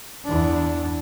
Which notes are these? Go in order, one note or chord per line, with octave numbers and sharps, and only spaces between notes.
E2 D4